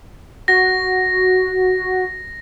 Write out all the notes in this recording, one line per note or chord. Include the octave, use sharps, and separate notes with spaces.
F#4 A#6